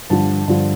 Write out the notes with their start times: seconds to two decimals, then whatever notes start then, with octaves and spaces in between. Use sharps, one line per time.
0.10 G2 D3 F3 A5
0.48 G2 D3 F3